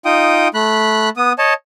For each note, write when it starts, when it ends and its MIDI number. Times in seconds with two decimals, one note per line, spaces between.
0.05 0.48 63
0.05 0.48 65
0.05 0.48 79
0.05 0.48 87
0.54 1.09 57
0.54 1.09 83
0.54 1.09 90
1.17 1.33 59
1.17 1.33 87
1.38 1.54 73
1.38 1.54 75
1.38 1.54 81